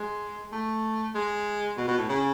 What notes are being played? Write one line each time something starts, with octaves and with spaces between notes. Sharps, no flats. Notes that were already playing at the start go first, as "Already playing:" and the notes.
Already playing: G#3
A3
G#3
B2
B2
A2
C#3